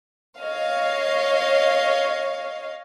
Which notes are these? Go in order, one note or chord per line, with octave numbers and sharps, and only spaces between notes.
C#5 D#5 F5